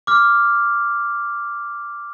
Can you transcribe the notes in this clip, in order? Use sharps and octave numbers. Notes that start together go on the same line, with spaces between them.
D6 F6